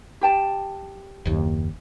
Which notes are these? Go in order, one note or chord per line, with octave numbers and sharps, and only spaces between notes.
G4 G5 A5
F#1 D#2